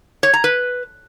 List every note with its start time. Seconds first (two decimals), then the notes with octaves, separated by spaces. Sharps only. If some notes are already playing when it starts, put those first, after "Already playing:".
0.23 C#5
0.33 A#5
0.44 B4